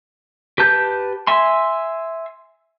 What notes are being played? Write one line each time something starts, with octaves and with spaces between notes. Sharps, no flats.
G4 B4 A5 G6
E5 G#5 C6